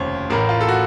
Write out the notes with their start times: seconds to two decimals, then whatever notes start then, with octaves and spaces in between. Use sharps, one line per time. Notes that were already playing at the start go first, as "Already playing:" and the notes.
Already playing: F1 D#2 C#3 C5 C#5
0.30 A1 A2 A#4
0.49 F4
0.61 A4
0.68 F#4